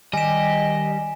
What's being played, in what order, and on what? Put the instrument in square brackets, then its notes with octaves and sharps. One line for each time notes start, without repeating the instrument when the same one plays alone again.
[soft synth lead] D#3 [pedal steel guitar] G3 G4 [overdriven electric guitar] D#5 [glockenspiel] G#5 E7